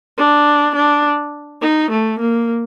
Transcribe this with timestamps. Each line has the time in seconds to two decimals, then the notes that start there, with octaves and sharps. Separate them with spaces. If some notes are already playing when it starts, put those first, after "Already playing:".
0.18 D4
0.76 D4
1.62 D#4
1.91 A3
2.20 A#3